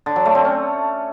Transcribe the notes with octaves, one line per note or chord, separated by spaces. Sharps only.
D3
F#3
A3
C4
C#4